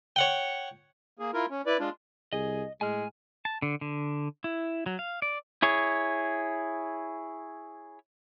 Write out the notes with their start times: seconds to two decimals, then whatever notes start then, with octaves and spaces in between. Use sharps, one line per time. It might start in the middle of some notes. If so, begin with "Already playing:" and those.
0.16 C#5 F#5 G5
1.19 A#3 G#4
1.34 E4 F4 A#4
1.50 C#4
1.66 E4 B4 D5
1.80 G#3 D4 F4
2.33 C2 G#4 D#5
2.81 A2 G#3 G#5 F6
3.45 A5
3.62 D3
3.81 D3
4.44 E4
4.86 F#3
4.99 F5
5.22 D5
5.62 E4 G#4 C#5